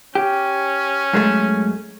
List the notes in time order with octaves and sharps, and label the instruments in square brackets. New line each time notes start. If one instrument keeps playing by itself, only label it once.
[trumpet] C#4 [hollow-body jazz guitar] G4
[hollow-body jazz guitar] F#2 G#3 A3